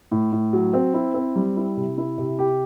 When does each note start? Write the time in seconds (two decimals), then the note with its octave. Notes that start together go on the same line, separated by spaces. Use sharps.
0.11 A2
0.32 A2
0.53 F#3
0.74 C4
0.94 E4
1.14 C4
1.36 G3
1.57 E4
1.77 C3
1.98 E4
2.18 C3
2.39 G4